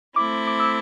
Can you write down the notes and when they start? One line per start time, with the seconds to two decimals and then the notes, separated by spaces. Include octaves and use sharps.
0.16 A3 C4 E4 D6
0.47 D6
0.59 E6